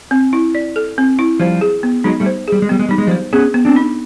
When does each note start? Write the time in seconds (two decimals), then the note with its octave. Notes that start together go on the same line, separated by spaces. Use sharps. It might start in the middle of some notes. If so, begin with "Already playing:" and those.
0.11 C4
0.33 E4
0.55 D5
0.76 A4
0.98 C4
1.19 E4
1.40 F3 G3 C5
1.61 G#4
1.83 B3
2.04 F#3 G#3 D#4
2.20 G3 A3
2.26 C5
2.48 G3 G#4
2.62 G#3
2.69 G3 B3
2.79 G#3
2.89 G3 D#4
2.98 G#3
3.07 F3 G3
3.11 C5
3.33 B3 C#4 G#4
3.54 B3
3.65 C4 D4
3.76 D#4